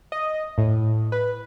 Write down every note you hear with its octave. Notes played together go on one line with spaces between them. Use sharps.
D#5
A2
B4